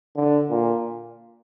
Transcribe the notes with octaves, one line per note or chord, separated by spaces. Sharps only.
D3
A#2